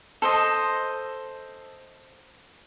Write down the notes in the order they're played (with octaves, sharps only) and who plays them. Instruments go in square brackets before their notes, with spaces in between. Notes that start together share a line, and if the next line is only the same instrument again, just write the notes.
[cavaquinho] A4 C5 D#5